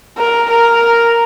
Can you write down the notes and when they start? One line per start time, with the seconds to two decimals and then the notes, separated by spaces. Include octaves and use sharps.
0.18 A#4
0.50 A#4